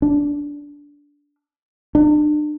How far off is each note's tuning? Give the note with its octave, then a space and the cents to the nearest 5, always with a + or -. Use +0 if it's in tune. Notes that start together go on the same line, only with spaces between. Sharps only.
D4 -15
D4 +35